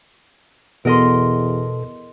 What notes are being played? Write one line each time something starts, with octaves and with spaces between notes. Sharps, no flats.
E2 B2 B3 A4 A#4 D#5 C6